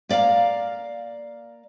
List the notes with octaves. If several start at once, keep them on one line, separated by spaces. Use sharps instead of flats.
A#3 D5 E5 F5 A#5